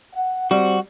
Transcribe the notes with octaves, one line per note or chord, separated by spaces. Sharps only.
F#5
G3 C4 F#4